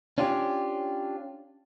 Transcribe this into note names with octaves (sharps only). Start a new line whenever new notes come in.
C#4 D4 F4 G4